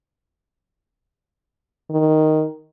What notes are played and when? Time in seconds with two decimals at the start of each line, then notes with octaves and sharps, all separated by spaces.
1.90 D#3